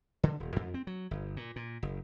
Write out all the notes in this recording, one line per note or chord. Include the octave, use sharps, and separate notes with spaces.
D3
D#1
F2
C4
F#3
G1
A#2
A#2
F#1